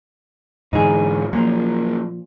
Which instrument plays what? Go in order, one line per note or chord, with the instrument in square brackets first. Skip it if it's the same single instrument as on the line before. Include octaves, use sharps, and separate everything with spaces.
[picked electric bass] G#2 D3 E3 [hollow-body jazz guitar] D#4 G#4
[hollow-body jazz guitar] A#2 F3 [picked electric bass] F#3 A#3